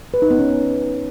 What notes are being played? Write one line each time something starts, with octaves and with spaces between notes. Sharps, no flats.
B4
D#4
B3
C#4